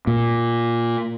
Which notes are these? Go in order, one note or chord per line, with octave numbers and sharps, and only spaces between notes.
A#2